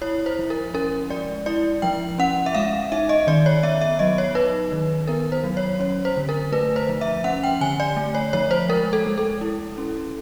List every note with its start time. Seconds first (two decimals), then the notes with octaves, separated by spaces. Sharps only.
0.02 E4 C#5
0.26 C5
0.39 F3
0.50 A#4
0.74 C#4 A#4
1.10 G#3 D5
1.46 E4 D5
1.82 F3 G5
2.18 C#4 F#5
2.46 E5
2.55 G#3 F5
2.92 D#4 E5
3.09 D#5
3.27 D#3 D5
3.46 C#5
3.63 B3 E5
3.81 E5
3.99 F#3 D#5
4.18 C#5
4.35 D#4 B4
4.72 D#3
5.08 B3 A#4
5.32 C5
5.44 F#3
5.57 C#5
5.80 C#4 C#5
6.05 C5
6.17 D3
6.29 A#4
6.52 A3 B4
6.76 C5
6.89 F3
7.01 E5
7.24 C#4 F#5
7.43 G5
7.61 D3 G#5
7.80 D5
7.97 A3
8.15 C#5
8.33 F3 C#5
8.51 C5
8.69 G#3 A#4
8.93 A4
9.06 G#3
9.18 A4
9.41 E4
9.78 C#4